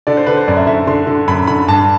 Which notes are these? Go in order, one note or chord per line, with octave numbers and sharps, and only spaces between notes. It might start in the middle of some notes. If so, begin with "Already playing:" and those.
D3 D5
C5
D3 B4
C5
F#2 D5
E5
D3 E5
D3 C6
D3
F#2 B5
D3 B5
G2 A5